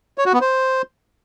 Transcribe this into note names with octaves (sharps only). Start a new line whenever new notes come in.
C#5
F#4
B3
C5